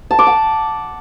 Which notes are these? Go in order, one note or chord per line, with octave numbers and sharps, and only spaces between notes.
A5
D6
F#5